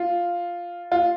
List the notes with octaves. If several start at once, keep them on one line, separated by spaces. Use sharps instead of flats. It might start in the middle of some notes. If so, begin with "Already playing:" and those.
Already playing: F4
F4